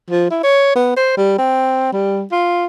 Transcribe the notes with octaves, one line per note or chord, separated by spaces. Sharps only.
F3
E4
C#5
B3
C5
G3
C4
G3
F4